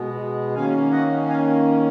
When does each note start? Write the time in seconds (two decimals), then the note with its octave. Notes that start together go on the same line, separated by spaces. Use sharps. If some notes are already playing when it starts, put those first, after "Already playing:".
Already playing: B2 G#3 B3
0.54 D#3 A#3 C#4 F5 G#5
0.92 D#5 F#5
1.29 F5 G#5